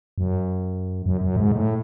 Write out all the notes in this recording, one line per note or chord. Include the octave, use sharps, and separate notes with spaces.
F#2
F#2
F#2
G#2
A2